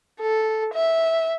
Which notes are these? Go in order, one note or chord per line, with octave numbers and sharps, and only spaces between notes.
A4
E5